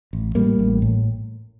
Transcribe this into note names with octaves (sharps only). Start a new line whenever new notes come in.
A1
A2 G3 A#3
A1
A2